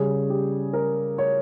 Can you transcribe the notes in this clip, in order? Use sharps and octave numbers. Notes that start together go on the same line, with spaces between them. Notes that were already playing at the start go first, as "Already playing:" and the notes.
Already playing: C#3 G3 C#4 G#4
G4
A#4
C#5